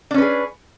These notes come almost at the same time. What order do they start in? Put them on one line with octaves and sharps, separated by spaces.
D4 C#4 B4 G#4